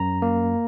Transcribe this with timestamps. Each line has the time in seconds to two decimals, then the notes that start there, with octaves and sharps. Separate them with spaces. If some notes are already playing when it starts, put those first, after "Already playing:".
Already playing: F#2 A#5
0.22 A#3